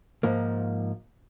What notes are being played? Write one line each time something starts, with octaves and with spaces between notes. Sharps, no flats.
G#2 F3 A#3